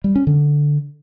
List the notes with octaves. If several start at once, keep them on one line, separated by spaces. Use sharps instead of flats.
G3
C#4
D3